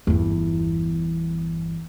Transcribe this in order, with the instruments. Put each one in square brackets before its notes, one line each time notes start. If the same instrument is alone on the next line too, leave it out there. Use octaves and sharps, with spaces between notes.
[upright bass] G1 E2